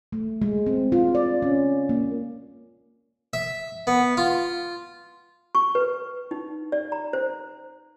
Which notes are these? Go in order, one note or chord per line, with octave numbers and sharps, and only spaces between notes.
A3
G#3
C4
F4
D5
C#4
A#3
E5
B3
F4
C#6
B4
D#4
D5
A#5
C5